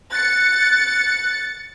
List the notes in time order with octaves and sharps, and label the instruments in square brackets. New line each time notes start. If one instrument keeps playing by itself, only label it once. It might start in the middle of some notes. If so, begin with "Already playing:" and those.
[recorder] F#6 [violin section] A6 C#7